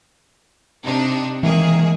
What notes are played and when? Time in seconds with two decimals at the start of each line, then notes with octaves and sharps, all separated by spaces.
0.84 C3 D4 D#4
1.43 D#3 E3 G#3 A#3 G#4